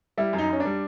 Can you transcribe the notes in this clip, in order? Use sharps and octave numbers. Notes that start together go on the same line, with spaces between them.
G3 E4
F#2
D#4
F#2 C#4
D4
G3